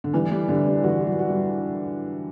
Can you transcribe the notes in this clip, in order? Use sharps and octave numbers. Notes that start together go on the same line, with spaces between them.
D3
E3 G3
G3
D3 G3
G3
E3 F#4
F#4
F#3
F#4
G3